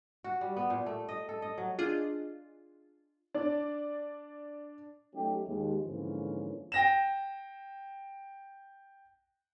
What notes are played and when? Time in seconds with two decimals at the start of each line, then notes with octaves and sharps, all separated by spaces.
0.24 F#4
0.41 G3
0.56 B3
0.70 A#2
0.86 A3
1.09 D#5
1.29 A4
1.42 D#5
1.58 F#3
1.79 D4 F4 G#4 D#5
3.34 D4 D5
5.13 F#3 A3 C#4 D#4 G4
5.47 D#2 G#3
5.85 G#2 D3 E3 F3 A#3 C#4
6.72 G5 A#6 E7